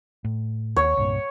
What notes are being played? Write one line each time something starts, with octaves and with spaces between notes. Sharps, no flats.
A2
D#2 C#5
C2 G2 A#2